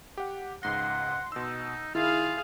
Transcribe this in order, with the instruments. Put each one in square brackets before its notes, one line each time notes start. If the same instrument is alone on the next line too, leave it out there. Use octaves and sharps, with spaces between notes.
[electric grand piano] G4 F#5
[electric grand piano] C#2 G#2 A#6 [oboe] F#5 [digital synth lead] C6
[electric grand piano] B2 E6 [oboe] D#4
[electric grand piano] D#3 [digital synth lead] E4 [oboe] F4 [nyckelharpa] G#4 F5